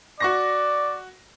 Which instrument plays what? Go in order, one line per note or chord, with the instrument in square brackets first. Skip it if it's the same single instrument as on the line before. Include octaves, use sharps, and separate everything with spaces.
[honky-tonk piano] F#4 C#6 A#6 [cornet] D5